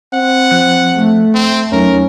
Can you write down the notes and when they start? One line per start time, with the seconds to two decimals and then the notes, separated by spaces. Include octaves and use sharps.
0.14 C4 F#5
0.51 F3 F#6 C#7
0.94 A3
1.34 C4
1.72 E2 F#3 C#4 D#4 A#4